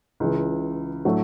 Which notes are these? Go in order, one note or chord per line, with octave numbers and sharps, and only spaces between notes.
C#2 C#3 E3
A2 F#3 A3 D4